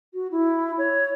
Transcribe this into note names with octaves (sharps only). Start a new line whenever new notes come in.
F#4
E4
C#5